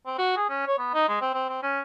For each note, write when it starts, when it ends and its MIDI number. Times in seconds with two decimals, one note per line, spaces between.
0.06 0.16 60
0.18 0.33 66
0.37 0.45 68
0.49 0.63 61
0.67 0.77 73
0.78 0.90 59
0.94 1.06 63
1.08 1.20 56
1.21 1.33 60
1.34 1.49 60
1.49 1.59 60
1.63 1.80 61